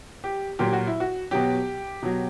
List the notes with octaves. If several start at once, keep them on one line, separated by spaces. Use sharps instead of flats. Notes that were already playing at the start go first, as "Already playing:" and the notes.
G4
A#2 F#3 G4
F#4
E4
F#4
B2 F#3 G4
B2 F#3